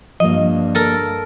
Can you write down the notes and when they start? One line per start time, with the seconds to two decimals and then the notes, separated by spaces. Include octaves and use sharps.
0.20 G2 F3 G3 A#3 D#5
0.75 A4 A#4